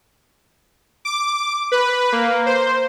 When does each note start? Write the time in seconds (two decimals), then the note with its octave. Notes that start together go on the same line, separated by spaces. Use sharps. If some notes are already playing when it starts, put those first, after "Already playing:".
1.05 D6
1.72 B4
2.12 A#3
2.46 C5